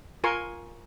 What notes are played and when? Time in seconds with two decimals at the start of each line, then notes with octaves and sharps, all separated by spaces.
0.24 F4 A#4 G#5 C6 C#6